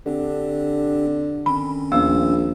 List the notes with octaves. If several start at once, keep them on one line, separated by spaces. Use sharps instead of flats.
D3 C4 D4 G4
D#3 C4 C#4 B5
A#1 D#2 B3 E6